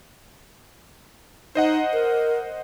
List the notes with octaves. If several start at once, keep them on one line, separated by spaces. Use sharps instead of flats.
D#4 C5 D#5 F#5
A#4